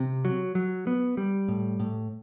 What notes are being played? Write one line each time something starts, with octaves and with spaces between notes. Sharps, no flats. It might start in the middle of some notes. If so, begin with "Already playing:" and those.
Already playing: C3
F#3
F#3
B3
G3
A2
A2